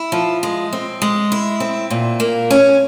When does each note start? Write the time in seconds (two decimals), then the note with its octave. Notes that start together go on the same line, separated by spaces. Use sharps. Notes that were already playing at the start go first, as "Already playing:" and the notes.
Already playing: E4
0.12 F3
0.43 G#3
0.73 C4
1.02 G#3
1.32 E4
1.60 C4
1.90 A#2
2.20 A#3
2.50 C#4